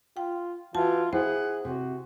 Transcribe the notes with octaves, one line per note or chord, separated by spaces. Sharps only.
F4 G5
E3 F4 F#4 A5
E4 G#4 C5 F#5
C3 F#4